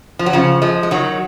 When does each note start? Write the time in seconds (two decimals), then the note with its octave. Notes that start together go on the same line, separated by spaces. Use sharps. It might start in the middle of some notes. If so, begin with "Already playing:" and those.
0.19 F3
0.26 F#3
0.33 C#3 F3
0.62 F3 G#3
0.83 G#3
0.91 D#3 F#3